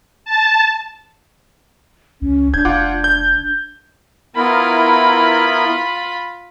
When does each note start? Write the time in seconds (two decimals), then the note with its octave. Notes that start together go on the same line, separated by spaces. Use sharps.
0.25 A5
2.22 C#2 C#4
2.54 E1 D4 G6 G#6
2.65 F1 F4 F#5 D6
3.04 G6
4.36 B3 E4 F4 A#4 B5